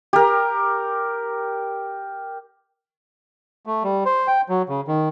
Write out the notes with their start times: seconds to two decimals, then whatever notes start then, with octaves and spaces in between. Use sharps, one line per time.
0.13 G4 A#4
3.66 A3
3.84 G3
4.05 C5
4.27 G5
4.49 F#3
4.69 C#3
4.88 D#3